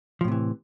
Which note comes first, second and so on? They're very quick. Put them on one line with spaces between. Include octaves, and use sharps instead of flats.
F3 A2 C3 E3